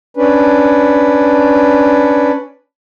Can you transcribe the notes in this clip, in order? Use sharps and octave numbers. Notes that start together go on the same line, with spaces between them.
C#4 D4 B4